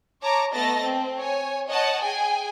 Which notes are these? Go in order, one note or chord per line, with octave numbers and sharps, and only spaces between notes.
C#5 A5 A#5 D6
A3 B3 D#5 A5 A6 A#6
C4
C#5 G#5
C#5 D#5 F#5 A5
G#4 G5 G#5